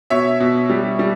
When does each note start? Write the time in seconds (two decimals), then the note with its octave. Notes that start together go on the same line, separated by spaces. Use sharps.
0.10 B2 C#5 E5
0.40 B2
0.70 G3
0.99 G3